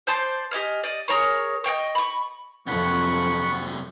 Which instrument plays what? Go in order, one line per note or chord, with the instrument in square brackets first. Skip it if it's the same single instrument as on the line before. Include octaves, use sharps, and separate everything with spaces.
[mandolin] C5 D5 A5 C6
G4 D#5 G#5 F6
D5 D#5
G#4 A#4 C#5 C#6
D#5 F#5 G5 C#6
B5 C#6
[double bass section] F2 [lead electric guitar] C3 F#3 [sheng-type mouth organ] F#5 B5 [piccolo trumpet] C#6